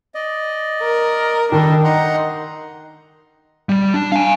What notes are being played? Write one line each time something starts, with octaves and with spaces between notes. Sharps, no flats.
D5 D#5
A#4
D#3 G3 D4 A4 D#5
D#4 F#5 A#5 C6
G3
D4
F5 G#5